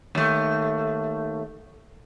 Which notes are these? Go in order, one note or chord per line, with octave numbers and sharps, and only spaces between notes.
D#2 A3